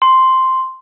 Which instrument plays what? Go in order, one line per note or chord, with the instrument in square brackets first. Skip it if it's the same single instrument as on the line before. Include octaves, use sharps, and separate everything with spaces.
[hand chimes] C6